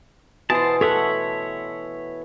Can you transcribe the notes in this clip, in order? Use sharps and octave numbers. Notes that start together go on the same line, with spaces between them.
B2 E3 B3 F#4 C5 G#5 A5 D#6
F#4 A4 C#5 E5 F#5